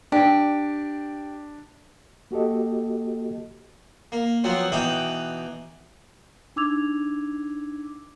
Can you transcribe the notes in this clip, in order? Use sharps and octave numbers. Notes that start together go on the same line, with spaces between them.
D4 G4
A#3 F#4 G4 A4 D#5
A#3
F3 F#3 B3 C4
B2 E3 D#4 G5 D6
D4 D#4 D6 E6 G#6 F7